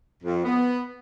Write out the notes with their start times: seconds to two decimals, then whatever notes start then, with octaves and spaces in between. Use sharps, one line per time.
0.23 F2
0.44 B3